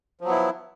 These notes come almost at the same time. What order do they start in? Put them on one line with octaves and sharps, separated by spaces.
F3 F#3 B3 E4